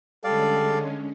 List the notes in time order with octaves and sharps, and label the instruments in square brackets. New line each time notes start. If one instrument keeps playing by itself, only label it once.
[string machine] D3 G#3 C#4 [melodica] G3 D5 F5 [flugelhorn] A4